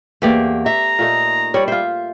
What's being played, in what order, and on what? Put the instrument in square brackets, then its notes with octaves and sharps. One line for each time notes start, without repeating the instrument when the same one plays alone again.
[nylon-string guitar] E2 A#3 [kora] A3 G4 D5
[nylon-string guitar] E5 [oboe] A#5
[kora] A#2 A3 D#4
[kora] G3 D5 [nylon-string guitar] C#5
[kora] F4 C5 [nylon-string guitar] E5